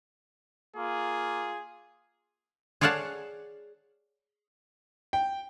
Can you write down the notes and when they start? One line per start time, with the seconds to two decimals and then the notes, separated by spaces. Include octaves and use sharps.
0.77 A#3 F4 G#4
2.81 G#4 C#5 D5 F5 F#5 A5
5.13 G5